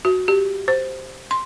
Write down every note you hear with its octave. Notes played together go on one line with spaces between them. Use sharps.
F#4
G4
C5
C6